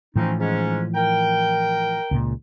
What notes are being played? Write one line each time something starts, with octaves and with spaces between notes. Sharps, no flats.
A2 E3 F3 C4 C#4 D#4
G#2 G#3 C#4
A#4 G5
C#2 A#2